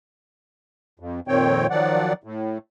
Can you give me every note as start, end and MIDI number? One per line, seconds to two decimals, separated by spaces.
1.00 1.20 41
1.28 1.67 41
1.28 1.67 46
1.28 1.67 51
1.28 1.67 60
1.28 1.67 73
1.28 1.67 79
1.70 2.13 51
1.70 2.13 53
1.70 2.13 54
1.70 2.13 74
1.70 2.13 78
2.24 2.58 45